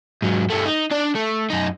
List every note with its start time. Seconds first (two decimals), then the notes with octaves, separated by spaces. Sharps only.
0.22 G#2 F#3
0.50 G2 A3
0.65 D#4
0.91 D4 D5
1.15 A3
1.50 F#2 D#4